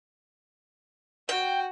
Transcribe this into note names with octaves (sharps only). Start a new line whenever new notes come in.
F#4 G5